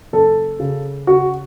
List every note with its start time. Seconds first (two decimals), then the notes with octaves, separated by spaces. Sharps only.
0.13 F#1 A4
0.60 C#3
1.07 C#3 F#4